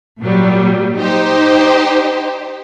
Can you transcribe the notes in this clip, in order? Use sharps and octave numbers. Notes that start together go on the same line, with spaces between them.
A#2 F#3 G3
D#4 G4 C5